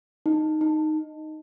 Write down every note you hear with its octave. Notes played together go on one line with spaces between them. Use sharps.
D#4
D#4